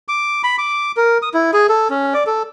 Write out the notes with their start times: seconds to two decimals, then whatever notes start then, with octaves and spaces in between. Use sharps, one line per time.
0.08 D6
0.44 B5
0.58 D6
0.97 A#4
1.22 D#6
1.34 E4
1.53 G#4
1.69 A4
1.90 C#4
2.14 D5
2.27 A4